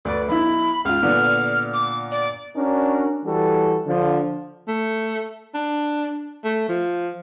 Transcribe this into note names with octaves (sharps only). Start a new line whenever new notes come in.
D2 B4 D5
B1 E4 B5
C#2 F4 F6
A#2 D3 B3
D6
D5
C#4 D4 F#4 A#4
E3 G3 F#4 A4
D3 F3
A3
D4
A3
F3